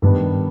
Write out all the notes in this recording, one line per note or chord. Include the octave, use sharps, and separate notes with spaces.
G2 D#3 G3 B3 D4